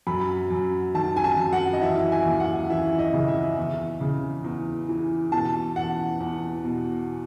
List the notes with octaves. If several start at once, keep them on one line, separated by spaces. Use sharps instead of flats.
F#2 B5
F#2
D#3 A5
G#5
A5
F#2
F#5
D#5
E3 E5
G#5
D#2
F#5
E3 E5
D#5
C#3
E5
E2
C#3
E2
E3
B2 A5
E2 F#5
E2
B2